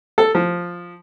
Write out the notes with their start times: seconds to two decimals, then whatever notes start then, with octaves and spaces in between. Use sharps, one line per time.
0.18 A4
0.35 F3